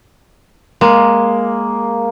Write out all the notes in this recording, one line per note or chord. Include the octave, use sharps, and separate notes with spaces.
G#3 A#3